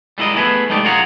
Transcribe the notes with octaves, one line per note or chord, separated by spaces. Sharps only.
G3 G#3 E4 A#4 D#5
A3 B3 E4 G#4 A#4 B4
G#3 A3 D#4 G4 D5
F#2 F4 G#4 A#4 F#5 A#5